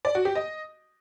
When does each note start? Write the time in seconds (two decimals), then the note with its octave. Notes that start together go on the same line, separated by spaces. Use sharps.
0.05 D5
0.15 F#4
0.25 G4
0.35 D#5